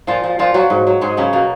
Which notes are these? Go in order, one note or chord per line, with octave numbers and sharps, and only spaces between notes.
A#2 F3 F4
F3
A#2 F3 F4
F3 F#3 F#4
G#2
F#3
G#2 G#3 G#4
C#3 F#3 C#4
B2 A#3